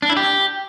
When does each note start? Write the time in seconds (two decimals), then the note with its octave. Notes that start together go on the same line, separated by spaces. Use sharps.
0.02 D4
0.10 E4
0.17 G4